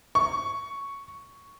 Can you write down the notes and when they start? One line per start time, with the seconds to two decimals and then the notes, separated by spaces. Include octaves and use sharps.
0.15 C#6